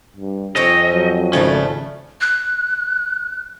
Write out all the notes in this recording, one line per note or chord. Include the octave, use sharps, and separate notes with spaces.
G2
F2 C4 C#4 C#5 D#5
F#3
G#1 C#3 F3 A3 C#4 D4
F#6